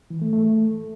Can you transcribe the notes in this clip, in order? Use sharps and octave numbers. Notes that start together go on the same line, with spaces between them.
E3
A3
A3